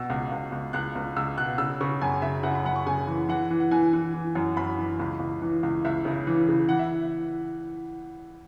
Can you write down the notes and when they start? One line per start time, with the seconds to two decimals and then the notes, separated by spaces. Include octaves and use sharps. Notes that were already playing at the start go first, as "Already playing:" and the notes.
Already playing: B2 E6
0.10 C#2
0.32 C#2
0.52 C#2
0.73 C#2 F#6
0.96 C#2
1.16 C#2 E6
1.37 B2 F#6
1.58 C#3 E6
1.81 C#3 C#6
2.01 F#2 G#5
2.22 C#3 E5
2.43 C#3 F#5
2.55 B5
2.65 F#2 F#5
2.76 C#6
2.86 C#3 G#5
3.07 E3
3.29 E3 F#5
3.50 E3
3.60 F#5
3.71 E3 G#5
3.93 E3
4.14 E3
4.35 F#2
4.57 F#2 B5
4.78 E3
4.99 C#2
5.20 C#2
5.42 E3
5.63 C#2
5.85 C#2 E5
6.05 C#3
6.27 E3
6.49 C#3
6.69 E3 F#5
6.79 E5